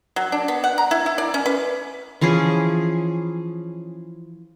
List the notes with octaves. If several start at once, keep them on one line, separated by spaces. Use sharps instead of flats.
F#3
D4
B3
F#5
A#5
E4
E4
D5
C#4
B4
E3 F3 C#4 G#4